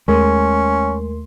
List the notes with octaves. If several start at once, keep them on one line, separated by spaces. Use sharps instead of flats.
D#2 G#3 A3 C#4 A#4 C6